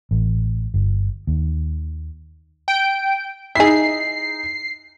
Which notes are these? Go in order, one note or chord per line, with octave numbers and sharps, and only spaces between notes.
A1
G1
D#2
G5 D7
D#4 E4 G#4 B6 C7